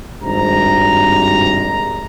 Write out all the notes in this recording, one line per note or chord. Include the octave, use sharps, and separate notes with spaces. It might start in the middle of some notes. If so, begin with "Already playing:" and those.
G#1 G2 C3 A#5